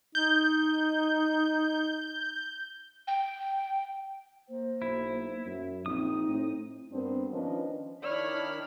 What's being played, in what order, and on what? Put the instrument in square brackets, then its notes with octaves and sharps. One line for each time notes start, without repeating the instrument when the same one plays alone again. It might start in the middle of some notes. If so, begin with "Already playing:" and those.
[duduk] D#4 [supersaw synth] G6
[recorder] G5
[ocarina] A#3 [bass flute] C5
[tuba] B1 [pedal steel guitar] E4
[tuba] F#2 [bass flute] E5
[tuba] A#1 [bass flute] C4 [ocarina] D#4 [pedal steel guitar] D#6
[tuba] A2
[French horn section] G2 B3 C4 D4 A#4 C5
D#3 F3 C#4 D4 B4 D#5
[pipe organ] D#3 D4 B5 [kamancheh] E4 F6 [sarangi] C#5 [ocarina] D5